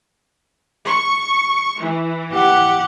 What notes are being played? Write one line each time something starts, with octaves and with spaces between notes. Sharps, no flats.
C#6
E3
G4 F#5